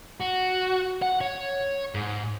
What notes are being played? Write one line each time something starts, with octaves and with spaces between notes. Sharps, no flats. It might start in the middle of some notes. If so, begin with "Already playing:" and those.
F#4
F#5
C#5
G#2